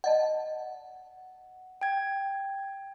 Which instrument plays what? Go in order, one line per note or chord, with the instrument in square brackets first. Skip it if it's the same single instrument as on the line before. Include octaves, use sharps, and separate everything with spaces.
[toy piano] D5 D#5 A5 [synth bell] F#5
[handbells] G5 G#6